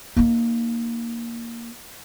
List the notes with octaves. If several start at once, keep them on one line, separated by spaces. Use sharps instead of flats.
A#3 D#4